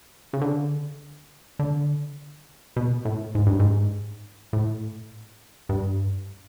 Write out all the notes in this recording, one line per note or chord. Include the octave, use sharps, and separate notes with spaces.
C#3
D3
D3
B2
A2
G#2
G2
G#2
A2
G2